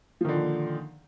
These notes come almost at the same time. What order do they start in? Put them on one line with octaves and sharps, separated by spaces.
F3 D#3 D3 A#2